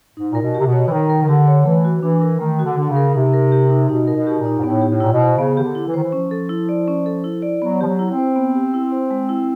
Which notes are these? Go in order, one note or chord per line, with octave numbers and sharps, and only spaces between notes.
G#2 D#4
A#2 A#4
B2
G4
C3
B2
C#5
E3
D#3 D#4
A#4
D#3
D3 G4
C#5
E3 A3
F#4
E3 D4
A#4
D#3 A3
F#4
D3
D3 D4
C#3
A#4
C3 D#4
A#4
G4
D#4
B2 D#4
A#4
B2
G4
A#2
D#4
G#2
A2 B3
G4
A2
A#2 E4
B2
C5
C#3 B3
D#3 G4
D3
E4
E3
D#3 C5
E3
F3 C#4
A4
E4
D5
C#4
A4
E4
D5
F#3 B3
F3 G4
F#3
E4
C4
C5
B3
G4
E4
C5
G#3
E4